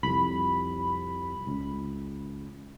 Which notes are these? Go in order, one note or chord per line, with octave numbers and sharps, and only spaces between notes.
C2 F2 B5
C#2